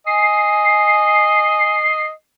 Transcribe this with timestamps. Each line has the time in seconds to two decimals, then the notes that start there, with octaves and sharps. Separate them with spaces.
0.06 D#5 G#5 C7